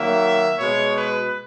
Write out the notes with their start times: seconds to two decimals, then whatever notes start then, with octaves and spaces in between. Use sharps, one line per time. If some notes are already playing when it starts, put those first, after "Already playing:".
Already playing: D#3 F#3 A#3 E5
0.59 B2 G#3 C#5
0.96 B4